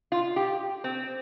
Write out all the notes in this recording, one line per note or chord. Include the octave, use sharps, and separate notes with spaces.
F4
G4
C4